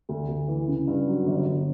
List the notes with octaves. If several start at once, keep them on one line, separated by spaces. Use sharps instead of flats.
D2
D2
E3
C#3
G2
F#3
G1
G1